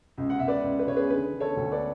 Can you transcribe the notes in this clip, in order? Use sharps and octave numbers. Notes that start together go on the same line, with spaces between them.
C#2
F#5
C#2 E5
B4 D5
C#2
B4
C#2 C#5
G#4 B4
D3 G#4 B4
D3
A4 C#5
D2
B4 D5